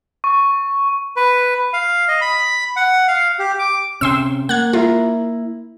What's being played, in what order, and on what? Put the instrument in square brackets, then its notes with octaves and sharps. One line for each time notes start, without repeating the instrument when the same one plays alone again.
[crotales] C#6
[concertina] B4
F5
D#5
B5
F#5
F5
G4
D6
[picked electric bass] C3 C#4 [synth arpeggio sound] G5 C6 E6
[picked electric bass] A#3 [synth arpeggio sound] F#5 G#6
[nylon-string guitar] E4 A#4 [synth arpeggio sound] F4